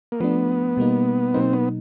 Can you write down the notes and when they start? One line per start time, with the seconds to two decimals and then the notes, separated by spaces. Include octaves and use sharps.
0.12 A#3
0.20 F3 A3 B3 D4
0.77 B2 G3 A#3 D#4
1.34 B2 F#3 A#3 C4 D#4
1.53 B3